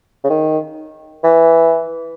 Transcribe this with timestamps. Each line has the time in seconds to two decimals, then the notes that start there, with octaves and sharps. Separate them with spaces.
0.24 C#3
0.30 D#3
1.24 E3